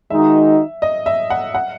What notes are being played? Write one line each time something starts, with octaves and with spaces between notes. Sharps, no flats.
D#3 G#3 D#4 F#4 E5
D#5
E5
F#5
F#5